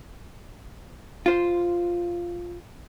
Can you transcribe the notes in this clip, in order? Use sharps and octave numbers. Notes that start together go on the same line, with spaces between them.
F4 C5